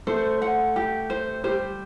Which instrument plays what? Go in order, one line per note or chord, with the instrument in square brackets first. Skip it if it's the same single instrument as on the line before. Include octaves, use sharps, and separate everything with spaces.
[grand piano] A3 A4 [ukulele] C5
[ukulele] F#5
G4
C5
[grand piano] G3 G4 [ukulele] C5